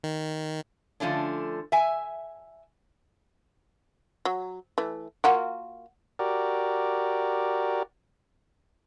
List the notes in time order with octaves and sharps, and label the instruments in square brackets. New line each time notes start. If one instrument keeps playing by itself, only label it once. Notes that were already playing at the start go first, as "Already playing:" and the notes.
[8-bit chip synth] D#3
[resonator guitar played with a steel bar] D3 F3 A3 C#4 D4
E5 G#5
[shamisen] F#3
E3 A3
[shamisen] A#3 F4 F#4 [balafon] F#5
[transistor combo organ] F#4 G4 A#4 D5